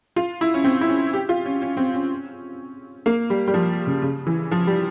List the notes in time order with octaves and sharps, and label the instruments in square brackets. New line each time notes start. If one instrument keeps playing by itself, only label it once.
[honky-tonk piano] F4
E4
C#4
C4
E4
C#4
G4
F4
C#4
C#4
C4
C#4
A#3
G3
G3
F3
C#3
C#3
E3
F3
G3